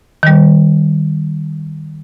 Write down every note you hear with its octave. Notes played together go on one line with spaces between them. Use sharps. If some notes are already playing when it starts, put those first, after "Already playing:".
D#3 G3